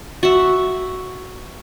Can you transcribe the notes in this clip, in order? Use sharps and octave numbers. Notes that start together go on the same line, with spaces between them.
F#4 E5